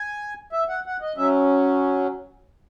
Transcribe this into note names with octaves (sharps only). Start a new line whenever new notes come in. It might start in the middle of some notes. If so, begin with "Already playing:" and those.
Already playing: G#5
E5
F#5
F#5
D#5
F#3 C#4 E5